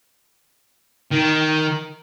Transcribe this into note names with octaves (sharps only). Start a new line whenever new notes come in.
D#3